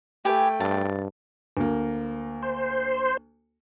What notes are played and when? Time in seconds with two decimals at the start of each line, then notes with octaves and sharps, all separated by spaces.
0.25 A3 G4 B4 G5 G#5
0.60 G2 A5
1.57 D2 A#3
2.43 C5